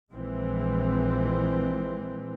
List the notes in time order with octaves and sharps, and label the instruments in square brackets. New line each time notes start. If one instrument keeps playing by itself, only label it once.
[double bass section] A#1 E3 G#3 C4